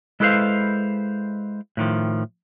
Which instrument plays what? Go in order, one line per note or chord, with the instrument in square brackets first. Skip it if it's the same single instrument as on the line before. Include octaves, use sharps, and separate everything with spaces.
[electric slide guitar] G#3 E4 A4 B4 C5 F5
A2 D#3 F3